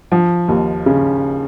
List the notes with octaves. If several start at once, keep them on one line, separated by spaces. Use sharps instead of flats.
F3
D#2
C#3